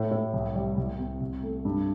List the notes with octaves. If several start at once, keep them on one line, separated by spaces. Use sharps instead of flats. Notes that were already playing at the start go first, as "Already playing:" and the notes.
Already playing: A2
A2
C2
G3
C2
C4
C2
A3
G2